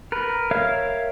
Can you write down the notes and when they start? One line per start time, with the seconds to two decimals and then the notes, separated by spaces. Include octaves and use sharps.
0.12 A#4 B4
0.51 A#4 C#5 E5 F5 F6